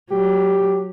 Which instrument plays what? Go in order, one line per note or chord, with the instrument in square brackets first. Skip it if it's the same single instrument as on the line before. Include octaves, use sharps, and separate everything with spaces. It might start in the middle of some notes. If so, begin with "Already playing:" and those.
[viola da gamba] F#3 [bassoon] G4